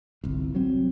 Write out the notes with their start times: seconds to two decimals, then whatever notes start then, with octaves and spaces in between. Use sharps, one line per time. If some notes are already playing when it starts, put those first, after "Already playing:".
0.24 G1 C2
0.55 F#3 C4